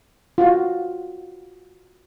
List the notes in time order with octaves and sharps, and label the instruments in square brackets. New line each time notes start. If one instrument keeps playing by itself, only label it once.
[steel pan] F4 F#4